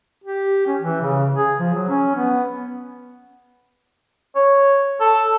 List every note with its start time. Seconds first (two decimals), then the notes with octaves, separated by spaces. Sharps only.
0.24 G4
0.66 C#4
0.80 E3
1.01 C#3
1.35 G#4
1.59 F3
1.73 F#3
1.88 C#4
2.14 B3
4.35 C#5
5.00 A4